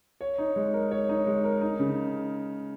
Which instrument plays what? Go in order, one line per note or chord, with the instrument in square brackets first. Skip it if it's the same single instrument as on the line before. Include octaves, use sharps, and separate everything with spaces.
[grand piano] C#5
D#4
G#3
A#4
C#5
D#4
G#3
A#4
D#4
C#3